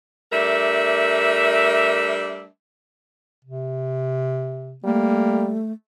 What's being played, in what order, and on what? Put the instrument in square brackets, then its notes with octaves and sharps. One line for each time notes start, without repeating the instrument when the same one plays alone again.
[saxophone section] G3 A3 D4 A#4 E5
[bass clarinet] C3
[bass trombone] G3 [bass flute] A3 [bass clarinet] A#3